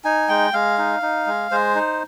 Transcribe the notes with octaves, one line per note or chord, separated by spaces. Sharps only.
D#4 G#5
G#3 G5
G#3 F5
D#4
D#4
G#3
G#3 C5
D#4